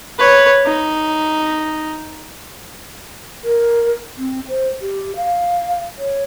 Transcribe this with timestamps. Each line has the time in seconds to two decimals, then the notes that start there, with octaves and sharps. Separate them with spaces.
0.19 B4 C#5
0.66 D#4
3.44 A#4
4.17 C4
4.49 C5
4.81 G4
5.16 F5
5.98 C#5